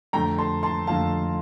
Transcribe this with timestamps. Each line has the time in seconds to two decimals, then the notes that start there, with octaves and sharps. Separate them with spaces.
0.13 F2 D3 A3 G5 A#5
0.38 A5 C6
0.63 A5 C6
0.87 F2 D3 A3 F5 A5